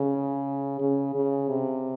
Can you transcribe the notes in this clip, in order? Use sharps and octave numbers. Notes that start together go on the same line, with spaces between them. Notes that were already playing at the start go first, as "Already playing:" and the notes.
Already playing: C#3
C#3
C#3
C3